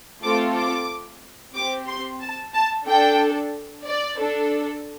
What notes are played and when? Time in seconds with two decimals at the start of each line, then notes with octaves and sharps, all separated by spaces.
0.23 A3 C4 F4 A4 D6
0.56 D6
1.55 C4 G4 D6
1.88 C6
2.20 A5
2.54 A5
2.87 D4 A4 G5
3.86 D5
4.19 D4 A4